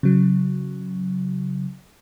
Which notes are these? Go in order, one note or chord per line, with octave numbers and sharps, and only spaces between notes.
C#3 F#3